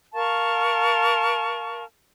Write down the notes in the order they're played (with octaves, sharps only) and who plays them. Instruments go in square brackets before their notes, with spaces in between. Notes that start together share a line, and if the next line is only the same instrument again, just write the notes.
[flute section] A#4 F5 A5 C#6